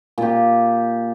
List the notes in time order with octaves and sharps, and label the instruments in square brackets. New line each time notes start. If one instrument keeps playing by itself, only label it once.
[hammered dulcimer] A#2 G4